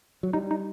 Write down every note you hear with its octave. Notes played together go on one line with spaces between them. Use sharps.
F#3
G3 D#4
D#4